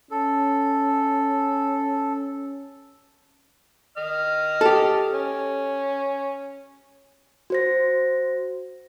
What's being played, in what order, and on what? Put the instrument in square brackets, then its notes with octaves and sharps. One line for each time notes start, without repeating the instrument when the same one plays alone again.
[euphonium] C#4 [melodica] A4
[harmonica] D#5 F6
[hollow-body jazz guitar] G4 A4
[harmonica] C#4
[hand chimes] F#4 C5 A#6